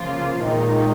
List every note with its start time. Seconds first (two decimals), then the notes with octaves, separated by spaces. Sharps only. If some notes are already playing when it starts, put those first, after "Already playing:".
Already playing: C#3 F3 A#3 F4
0.39 A#2 D#3 G#3 D#4